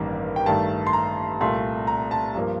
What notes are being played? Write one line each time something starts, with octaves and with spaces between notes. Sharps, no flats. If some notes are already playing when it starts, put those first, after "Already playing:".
Already playing: A1 G2 D#3 G3 A#3
G5
G2 D#3 A3 A5
C6
A#5
C2 A#2 A3 C6
A#5
A5
G2 F3 A#3